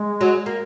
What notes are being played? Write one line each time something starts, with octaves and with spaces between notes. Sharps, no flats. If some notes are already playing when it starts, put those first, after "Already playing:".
Already playing: G#3
F#3
A#3